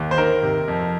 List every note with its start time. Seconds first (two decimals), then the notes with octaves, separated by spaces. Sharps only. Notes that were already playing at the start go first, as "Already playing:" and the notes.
Already playing: D#2
0.11 C5
0.18 D#3 A#4
0.43 C3
0.68 F2